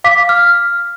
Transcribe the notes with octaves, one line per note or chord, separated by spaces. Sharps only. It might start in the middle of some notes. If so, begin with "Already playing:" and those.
F5 D6 B6
F6